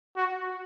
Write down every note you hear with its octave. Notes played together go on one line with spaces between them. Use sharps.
F#4